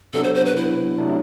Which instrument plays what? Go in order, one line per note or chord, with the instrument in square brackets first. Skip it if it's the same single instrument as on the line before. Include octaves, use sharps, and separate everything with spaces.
[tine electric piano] C3 F#3 B3 D4 [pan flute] A4
[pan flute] C5
C5
B4
E4
[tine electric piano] C3 F#3 A3 D4